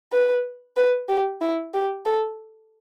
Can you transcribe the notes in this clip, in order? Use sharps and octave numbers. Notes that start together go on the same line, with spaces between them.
B4
B4
G4
E4
G4
A4